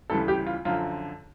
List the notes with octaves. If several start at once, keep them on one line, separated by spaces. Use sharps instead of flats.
D2 C#3 E3 G3 A4
G4
F4
F#2 D3 F3 F4